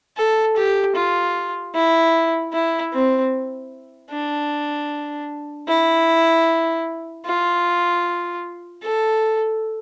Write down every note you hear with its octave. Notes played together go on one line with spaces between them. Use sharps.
A4
G4
F4
E4
E4
C4
D4
E4
F4
A4